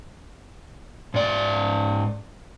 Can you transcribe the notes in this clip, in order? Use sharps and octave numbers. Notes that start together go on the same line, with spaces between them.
G#2 D5